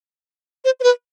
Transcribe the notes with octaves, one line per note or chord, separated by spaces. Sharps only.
C5
C5
B4